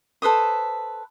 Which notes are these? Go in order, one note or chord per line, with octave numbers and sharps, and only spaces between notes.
A4 B4 C5 D#6